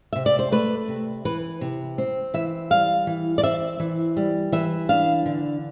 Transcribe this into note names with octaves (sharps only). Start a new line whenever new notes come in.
C3 E5
D5
C5
A3 B4
C3
E3 B4
C3
C4
E3 E5
G3 F5
E3
D5
C4 E5
E3
G3
E3 E5
D4 F5
D3